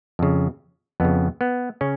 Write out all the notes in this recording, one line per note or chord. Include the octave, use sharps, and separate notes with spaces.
F2 C#3
F2 C#3 B3
B3
C#3 C#4